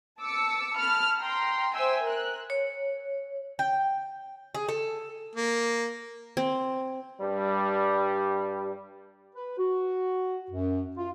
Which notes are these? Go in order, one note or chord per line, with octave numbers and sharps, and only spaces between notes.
A5 D6 E6 C#7
A5 B5 F6
G5 A#5 C6
C5 E5 G5 G#5 E6
A#4 F#6
C#5
G5
G#4
A4
A#3
C4
G2 G3
B4
F#4
F#2
F4